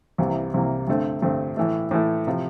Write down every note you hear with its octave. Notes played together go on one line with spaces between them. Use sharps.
C2 C3 E3 A#3
C2 C3 E3 A#3
G2 D3 A3 C4
G2 D3 A3 C4
A2 E3 A3
A2 E3 A3
C3 F3